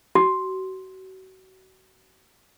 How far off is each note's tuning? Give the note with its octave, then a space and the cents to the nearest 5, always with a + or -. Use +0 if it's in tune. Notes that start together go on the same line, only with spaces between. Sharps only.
F#4 +30